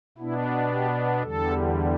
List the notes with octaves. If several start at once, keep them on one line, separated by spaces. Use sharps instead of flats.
B2 B3 D4 E4
G4
E2 D3 G3 A4